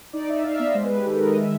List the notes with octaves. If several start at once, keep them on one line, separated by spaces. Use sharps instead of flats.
D#4 D5
D#4 E5
D#4 F5
E5
B3
D#5
G#3 C5
B4
G#3
G4
D#3 A4
A#4
D#3
D#5
G#3 E5